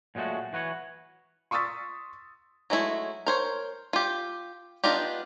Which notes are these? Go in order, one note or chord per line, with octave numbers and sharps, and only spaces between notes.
A#2 F#3 G#3 A3 F#4
E3 F#4 B4 C#5
C6 C#6 D#6 E6 A6 B6
F#3 G#3 A3 E4
A#4 C5 C#5
F4 G4
B3 D4 D#4 F4 G4